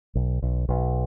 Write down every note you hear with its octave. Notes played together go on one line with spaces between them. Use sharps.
B1
B1
B1